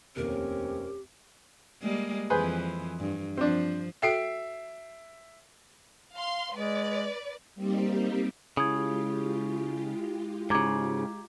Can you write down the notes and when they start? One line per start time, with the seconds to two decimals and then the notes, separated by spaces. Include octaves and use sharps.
0.16 F1 D#2 C4 C#4 G4 A#4
1.82 G3 G#3 A#3
2.30 F2 E3 G#4 B4 C5
3.00 G2
3.37 F3 C4 D4
4.02 F#4 A4 E5 G5 C7 D7
6.13 F5 C6
6.54 G#3 B4 D5
7.55 G3 A#3 C4 D#4 G4
8.57 C#3 G#3 E4 F4 G4 D#6 G#6
10.50 G#2 C#3 A#5 D6 G#6